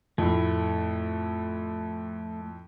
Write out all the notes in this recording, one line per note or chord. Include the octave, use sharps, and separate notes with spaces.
F2 A2 A3